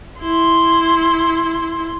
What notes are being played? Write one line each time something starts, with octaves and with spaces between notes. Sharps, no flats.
E4 C6